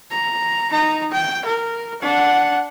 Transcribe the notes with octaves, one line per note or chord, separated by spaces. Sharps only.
A#5
D#4 A#5
G5
A#4
D4 F#5